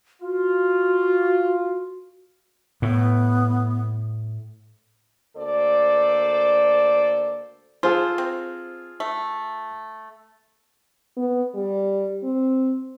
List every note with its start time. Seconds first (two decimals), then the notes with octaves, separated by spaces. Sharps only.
0.22 F4 F#4
2.82 A2 B3
5.36 D2 A#3 A4 C5 D5
7.83 F4 G#4 A4 C5
8.18 C4
9.00 A3
11.16 B3
11.55 G3
12.23 C4